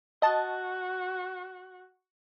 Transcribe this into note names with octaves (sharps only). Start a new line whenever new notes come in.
F#4 D#5 A5